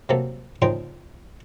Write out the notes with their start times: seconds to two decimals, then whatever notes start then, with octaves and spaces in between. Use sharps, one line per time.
0.09 C3 F#3 A#3 A4
0.62 A#2 C#3 F3 D#4 G5 C6